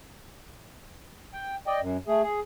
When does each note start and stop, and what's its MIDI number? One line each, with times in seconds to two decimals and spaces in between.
1.34 1.56 79
1.67 1.80 74
1.67 1.80 75
1.67 1.80 79
1.81 1.97 42
2.08 2.22 57
2.08 2.22 68
2.23 2.40 68